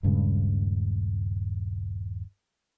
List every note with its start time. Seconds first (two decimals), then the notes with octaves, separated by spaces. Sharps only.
0.03 D#1 G2 C#3 G#3